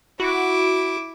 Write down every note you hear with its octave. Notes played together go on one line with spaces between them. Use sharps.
E4 F#4 D6